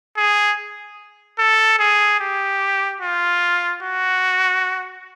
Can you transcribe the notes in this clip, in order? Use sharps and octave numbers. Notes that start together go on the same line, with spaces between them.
G#4
A4
G#4
G4
F4
F#4